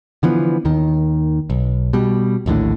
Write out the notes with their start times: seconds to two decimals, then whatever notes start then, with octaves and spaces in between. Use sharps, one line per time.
0.23 D3 E3 F3 B3
0.65 D#2 D#3
1.50 B1
1.93 B2 G3
2.46 A#1 D#2 A2 D3